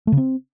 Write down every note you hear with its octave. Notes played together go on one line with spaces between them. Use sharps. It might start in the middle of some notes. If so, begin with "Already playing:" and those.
A3
C#3
C4